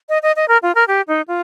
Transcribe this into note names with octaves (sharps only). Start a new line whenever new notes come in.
D#5
D#5
D#5
A#4
F4
A#4
G4
D#4
F4